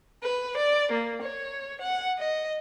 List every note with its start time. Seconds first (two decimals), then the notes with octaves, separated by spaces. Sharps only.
0.23 B4
0.57 D5
0.92 A#3
1.22 C#5
1.82 F#5
2.18 D#5